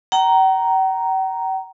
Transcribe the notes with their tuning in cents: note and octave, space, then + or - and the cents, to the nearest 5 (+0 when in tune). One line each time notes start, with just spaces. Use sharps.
G5 -45 A#5 +0